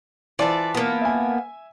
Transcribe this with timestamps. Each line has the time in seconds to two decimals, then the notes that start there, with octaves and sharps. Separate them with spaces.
0.39 E3 F4 A4 B4 C5 D5
0.75 A#3 B3
1.01 E5 G#5